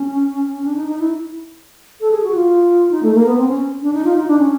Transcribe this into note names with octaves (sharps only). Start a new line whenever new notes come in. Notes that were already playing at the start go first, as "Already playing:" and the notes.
Already playing: C#4
D4
D#4
D#4
E4
A4
G#4
F#4
F4
D#4
A3
A#3
B3
C4
C#4
D4
D#4
F4
D#4
D4
C#4